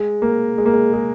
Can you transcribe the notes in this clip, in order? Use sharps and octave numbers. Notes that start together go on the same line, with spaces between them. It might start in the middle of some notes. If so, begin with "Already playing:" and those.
Already playing: G#3
A#3
G#3
A#3
G#3
G#3